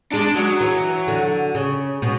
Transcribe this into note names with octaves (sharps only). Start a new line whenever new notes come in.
G#3 D4
F#3
E3
D3
C#3
B2